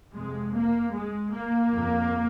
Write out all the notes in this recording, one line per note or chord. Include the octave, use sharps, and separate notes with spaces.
F2 C3 G#3
A#3
G#3
A#3
F2 C#3